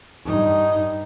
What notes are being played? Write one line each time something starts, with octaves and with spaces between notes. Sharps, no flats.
G2 D#4